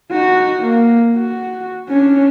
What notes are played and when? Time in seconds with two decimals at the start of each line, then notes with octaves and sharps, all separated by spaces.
0.12 D#4 F#4
0.63 A#3
1.17 F#4
1.89 C#4 D4